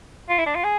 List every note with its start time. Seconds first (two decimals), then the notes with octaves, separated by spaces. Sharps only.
0.29 F4
0.38 E4
0.46 D4
0.55 F4
0.64 G#4